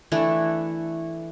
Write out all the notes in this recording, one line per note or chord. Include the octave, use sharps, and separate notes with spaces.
E3 A3 D4 E4